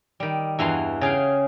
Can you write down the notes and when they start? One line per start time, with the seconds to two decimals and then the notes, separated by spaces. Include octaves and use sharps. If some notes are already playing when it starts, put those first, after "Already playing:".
0.20 D#3 G3
0.59 E2 G2 E3 F#4 F5 C6
1.01 C#3 G#4 F5 G5